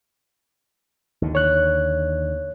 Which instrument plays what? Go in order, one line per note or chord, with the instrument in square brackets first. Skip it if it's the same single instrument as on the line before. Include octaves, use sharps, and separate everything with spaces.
[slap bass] D#2 D3
[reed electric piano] C#5 F#6